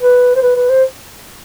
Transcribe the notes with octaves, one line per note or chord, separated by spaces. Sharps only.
B4
C5
B4
B4
C5